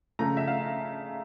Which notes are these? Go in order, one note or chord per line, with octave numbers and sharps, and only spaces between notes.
C#3 F3 A3 A#5
E5
F5